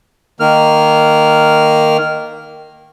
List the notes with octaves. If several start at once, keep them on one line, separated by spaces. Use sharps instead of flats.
D#3 A#3 F6